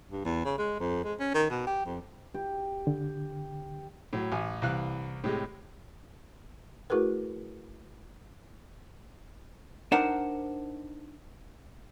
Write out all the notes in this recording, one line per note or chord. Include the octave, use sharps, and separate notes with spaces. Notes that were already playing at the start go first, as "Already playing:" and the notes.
G2
E2
C#3
G#3
F2
G#3
C#4
D#3
B2
G4
F2
G4
D3
A2 F#3
A1 G#5
C2 E3 F5 F#6
A2 C3 G#3
A3 E4 F#4 G#4 A#4 B4
D4 D#4 A#4 C5 F#5